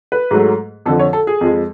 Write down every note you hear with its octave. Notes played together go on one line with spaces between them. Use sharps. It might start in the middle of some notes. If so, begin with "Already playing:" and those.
B4
G#2 F#3 A3
F2 D3 F3 A4
C#5
A4
G#4
F2 F3 G#3